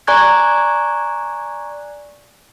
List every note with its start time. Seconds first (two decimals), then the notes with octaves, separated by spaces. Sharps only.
0.07 D5 G#5 A#5 C#6 F#6 G#6